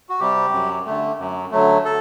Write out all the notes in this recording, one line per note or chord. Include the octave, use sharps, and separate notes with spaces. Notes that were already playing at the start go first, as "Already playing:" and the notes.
F#4
C3 G3 G4
F#2
D3 A3
F#2
D3 F#3 A3
A4